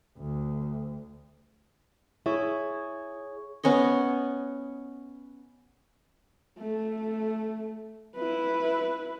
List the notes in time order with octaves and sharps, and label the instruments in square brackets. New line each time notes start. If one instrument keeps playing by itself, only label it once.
[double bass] D2
[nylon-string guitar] E4 [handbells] G#4 C#5 C#6
[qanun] B3 C#4 C#5 D#5
[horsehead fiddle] A3
E4 B4